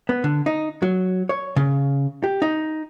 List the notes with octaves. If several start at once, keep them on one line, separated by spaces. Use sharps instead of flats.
B3
D3
D#4
F#3
C#5
C#3
G4
D#4